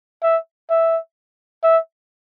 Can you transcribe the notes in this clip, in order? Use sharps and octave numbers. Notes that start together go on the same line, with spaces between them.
E5
E5
E5